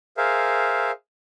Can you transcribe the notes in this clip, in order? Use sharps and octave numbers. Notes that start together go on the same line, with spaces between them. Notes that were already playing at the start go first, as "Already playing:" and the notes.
G#4 A#4 C5 E5 F5